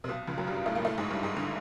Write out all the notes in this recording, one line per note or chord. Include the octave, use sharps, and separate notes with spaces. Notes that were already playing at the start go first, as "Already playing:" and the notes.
C3
B1 B2
C#2 C#3
F#2 F#3
G2 G3
A2 A3
A#2 A#3
A2 A3
G#2 G#3
G2 G3
G#2 G#3
D3